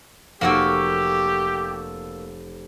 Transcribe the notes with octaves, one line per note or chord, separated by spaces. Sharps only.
F1 A#3 F#4 G4 A4 E6